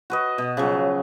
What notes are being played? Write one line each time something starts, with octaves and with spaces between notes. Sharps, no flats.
F#4 B4 D#5
B2
C#3 F3 F#3